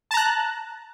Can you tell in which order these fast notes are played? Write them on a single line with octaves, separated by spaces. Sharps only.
A5 A#5 F#6